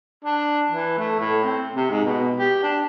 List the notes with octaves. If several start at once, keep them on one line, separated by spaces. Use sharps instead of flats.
D4
E3
A3
A2
C4
C3
G#2
B2
G4
D4